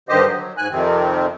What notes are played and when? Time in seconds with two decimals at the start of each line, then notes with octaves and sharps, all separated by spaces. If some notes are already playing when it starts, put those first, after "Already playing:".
0.09 G2 D3 D#3 G4 C5 D#5
0.27 F#3
0.57 G#2 G#5 F#6
0.71 F2 C3 D#3 C4